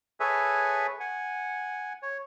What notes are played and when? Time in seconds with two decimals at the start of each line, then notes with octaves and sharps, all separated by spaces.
0.20 G#4 A4 B4 C#5 E5 G#5
1.00 F#5 G#5
2.03 C#5